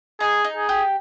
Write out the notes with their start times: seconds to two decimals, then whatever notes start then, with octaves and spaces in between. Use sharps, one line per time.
0.20 D#4 G#4
0.44 D#4
0.57 G#4
0.69 G4